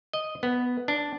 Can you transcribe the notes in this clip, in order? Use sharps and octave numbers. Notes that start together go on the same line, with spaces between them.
D#5
B3
D4